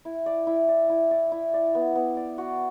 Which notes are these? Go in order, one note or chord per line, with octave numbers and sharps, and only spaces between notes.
E4
D5
E4
D5
E4
D5
E4
D5
B3
B3
D5
F#4